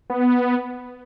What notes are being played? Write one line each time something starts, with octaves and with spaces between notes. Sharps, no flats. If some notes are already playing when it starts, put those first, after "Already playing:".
B3